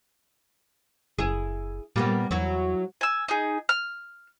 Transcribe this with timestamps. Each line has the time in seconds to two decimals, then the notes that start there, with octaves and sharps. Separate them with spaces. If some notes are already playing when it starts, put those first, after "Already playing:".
1.19 F#1 E4 G#4
1.96 A#2 G3 A#3 B3
2.31 E2 F#3 E4 F#4
3.01 G#5 E6
3.28 D#4 G#4
3.69 F6